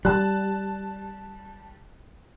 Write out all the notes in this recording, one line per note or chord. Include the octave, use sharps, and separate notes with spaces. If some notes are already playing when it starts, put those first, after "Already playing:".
G3 A5 F#6